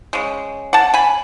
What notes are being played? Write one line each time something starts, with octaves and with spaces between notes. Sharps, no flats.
C#3 G#3
F#5 A5
G#5 B5